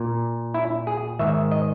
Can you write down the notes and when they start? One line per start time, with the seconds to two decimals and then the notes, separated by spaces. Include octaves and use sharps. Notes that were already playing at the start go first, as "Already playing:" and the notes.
Already playing: A#2
0.54 E4
0.87 G#4
1.19 G#2 D#3 E5
1.51 D#5